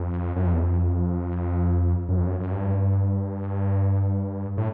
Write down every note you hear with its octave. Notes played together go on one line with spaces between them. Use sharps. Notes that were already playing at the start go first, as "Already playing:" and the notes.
Already playing: F2
F#2
F2
E2
F2
F#2
F2
F#2
F#2
G2
A2